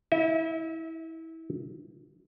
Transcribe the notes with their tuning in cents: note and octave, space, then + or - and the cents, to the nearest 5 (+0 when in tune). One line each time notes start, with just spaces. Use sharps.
E4 -25 E5 -45